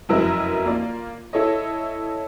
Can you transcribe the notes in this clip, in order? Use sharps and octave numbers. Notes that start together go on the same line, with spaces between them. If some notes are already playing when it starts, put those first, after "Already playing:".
F1 F#2 E4 A#4 B4 D#5
A#3 F4 D5
E4 A4 C#5 D#5